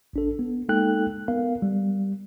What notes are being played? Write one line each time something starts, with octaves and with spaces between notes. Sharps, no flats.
A1 D4 A4
B3
G#3 A#3 D#4 A4 G5 F#6
B3 A#4 F5
G3